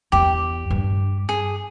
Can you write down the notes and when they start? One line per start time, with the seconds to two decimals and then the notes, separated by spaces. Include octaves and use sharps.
0.12 E2 G4
0.70 G2
1.29 G#4